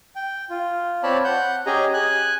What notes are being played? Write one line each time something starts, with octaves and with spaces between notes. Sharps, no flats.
G5
F4
C4 C#5 D5 A5 B5
F#5 G6
C#4 G4 G#4 D#5 G#5 A#5
G#5 F#6